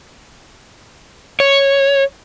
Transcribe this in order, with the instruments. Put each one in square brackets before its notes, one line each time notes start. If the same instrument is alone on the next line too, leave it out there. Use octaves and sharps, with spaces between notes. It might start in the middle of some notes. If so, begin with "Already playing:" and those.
[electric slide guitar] C#5